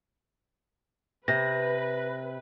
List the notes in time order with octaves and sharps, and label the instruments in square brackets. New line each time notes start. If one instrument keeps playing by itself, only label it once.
[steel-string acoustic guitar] C3 [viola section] B4 [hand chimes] A#6